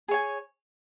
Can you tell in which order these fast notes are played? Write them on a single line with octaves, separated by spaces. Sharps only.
G#4 C#5 G#5